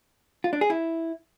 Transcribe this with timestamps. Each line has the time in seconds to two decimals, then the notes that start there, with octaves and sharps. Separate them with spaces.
0.44 F4
0.53 D4
0.61 G#4
0.70 E4